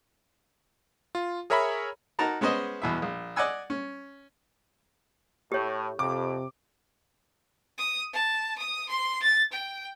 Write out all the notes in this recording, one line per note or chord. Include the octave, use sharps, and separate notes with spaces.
F4
G#4 A#4 C#5 E5 A#5 B5
D#4 F#4 A#4 A5 A#5
G#3 B3 C#4 C5 D#5
E2 B2 E5
A#1
D5 D#5 F#5 G#5 E6
C#4
A2 G4 C#5
F2 C3 D6
D#6
A5
D#6
C6
A6
G5